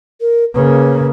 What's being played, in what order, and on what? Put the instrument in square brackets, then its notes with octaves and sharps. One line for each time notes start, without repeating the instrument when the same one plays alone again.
[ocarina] A#4
[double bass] C#3 A#3 [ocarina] B4